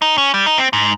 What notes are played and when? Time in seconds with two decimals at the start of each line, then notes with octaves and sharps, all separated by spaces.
0.02 D#4
0.18 C#4
0.34 G3
0.46 D#4
0.58 C4
0.73 G#2